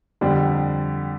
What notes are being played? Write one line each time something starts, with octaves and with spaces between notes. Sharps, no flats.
F2 D3 G3